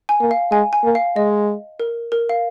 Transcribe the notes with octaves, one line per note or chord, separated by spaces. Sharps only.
G#5
A#3
F5
G#3 G#5
G#5
A#3
F5
G#3 D#5
A#4
A#4
F5